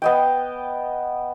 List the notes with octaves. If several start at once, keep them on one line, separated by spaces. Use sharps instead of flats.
B3 D#5 G5